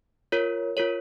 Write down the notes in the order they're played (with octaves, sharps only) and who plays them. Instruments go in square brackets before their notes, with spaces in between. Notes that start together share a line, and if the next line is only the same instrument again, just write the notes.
[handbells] F4 A#4 C#5
F4 A#4 C#5